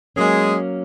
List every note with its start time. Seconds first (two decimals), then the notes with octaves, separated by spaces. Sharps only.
0.16 F#3 G#3 A#3 C#4 G#4